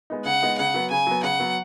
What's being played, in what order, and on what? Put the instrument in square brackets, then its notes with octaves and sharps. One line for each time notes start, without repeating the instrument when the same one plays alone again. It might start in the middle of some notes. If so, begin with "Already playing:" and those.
[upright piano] G#3 B3 D#4
[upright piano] C#3 [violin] F#5
[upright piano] G#3 B3 D#4
[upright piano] C#3 [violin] F#5
[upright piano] F#3 B3
[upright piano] C#3 [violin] G#5
[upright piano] F#3 B3
[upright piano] C#3 [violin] F#5
[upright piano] F#3 B3